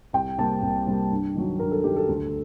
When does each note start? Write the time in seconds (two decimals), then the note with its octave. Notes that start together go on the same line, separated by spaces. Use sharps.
0.13 C2 G5
0.38 C3 G3 A#3 A5
0.62 C2
0.87 C3 G3 A#3
1.11 G2
1.35 D#3 F#3
1.59 G2 A#4
1.72 A4
1.84 D#3 F#3 G4
1.96 A4
2.08 D2